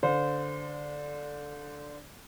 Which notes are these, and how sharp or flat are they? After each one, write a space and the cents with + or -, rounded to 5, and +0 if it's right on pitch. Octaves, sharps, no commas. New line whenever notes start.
D3 +0 C5 -15 F5 +45